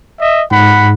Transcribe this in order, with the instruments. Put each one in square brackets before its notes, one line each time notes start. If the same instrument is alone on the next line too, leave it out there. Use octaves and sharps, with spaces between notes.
[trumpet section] D#5 E5
[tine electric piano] G#2 [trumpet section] F#5 B5